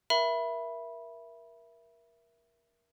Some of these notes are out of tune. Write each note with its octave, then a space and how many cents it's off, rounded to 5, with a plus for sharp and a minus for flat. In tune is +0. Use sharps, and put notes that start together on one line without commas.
A#4 +25 E5 +10 B5 -15